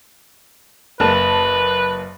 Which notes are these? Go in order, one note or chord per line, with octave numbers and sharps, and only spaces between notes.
F#1 A#3 B4 A5